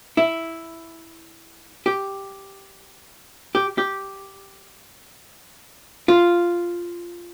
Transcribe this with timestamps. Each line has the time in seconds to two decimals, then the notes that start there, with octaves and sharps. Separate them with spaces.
0.17 E4
1.86 G4
3.55 G4
3.78 G4
6.08 F4